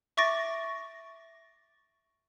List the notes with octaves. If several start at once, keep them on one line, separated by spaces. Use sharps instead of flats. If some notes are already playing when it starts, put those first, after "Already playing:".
E5 C#6 D6 A6 A#6 D7